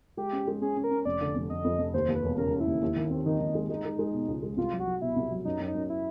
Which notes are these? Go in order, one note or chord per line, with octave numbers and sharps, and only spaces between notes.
G#3 G4
C#4
G#3
C#4 G#4
C#4
A#4
C#4
F1 D5
D3
F1
F1 D#5
F2
F1
D#2 C5
D#2
B4
E1
C#3 A#4
C#3
E4
D#2
D#2
D#3
C4
D#3 D#4
D#3
G#3
G#3 D#4
G#3
G#3
B2
C#2
G#3
C2 F4
F#3
F#4
F#3
B2 E4
C2
F#3
F#2 D#4
F#2
D#4
F#2
E4